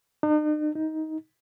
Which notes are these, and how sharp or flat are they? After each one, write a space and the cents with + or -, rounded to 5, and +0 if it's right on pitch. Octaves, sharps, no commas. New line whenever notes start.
D#4 -45
D#4 +15